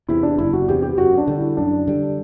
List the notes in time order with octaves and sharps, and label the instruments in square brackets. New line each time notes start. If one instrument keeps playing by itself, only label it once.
[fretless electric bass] E2 C3 [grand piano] E4
[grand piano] D4
[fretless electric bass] F#1 [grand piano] E4
[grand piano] F#4
[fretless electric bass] E2 C3 [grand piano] G4
[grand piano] G4
[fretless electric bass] F#2 [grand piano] F#4
[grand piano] D4
[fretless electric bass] D3 G3
[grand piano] E4
[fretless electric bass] F#2 [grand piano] D4
[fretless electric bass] D3 G3